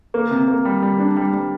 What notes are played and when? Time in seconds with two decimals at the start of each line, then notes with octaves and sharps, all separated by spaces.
0.14 A#3
0.31 C3
0.48 A#3
0.65 G3
0.82 G3
0.99 D4
1.17 G3
1.33 G3